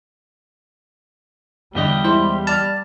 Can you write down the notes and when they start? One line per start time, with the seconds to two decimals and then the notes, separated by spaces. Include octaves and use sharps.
1.75 E2 G2 D3 G3 G4 D#5
2.05 G#3 E4 C5
2.47 D5 A5 F6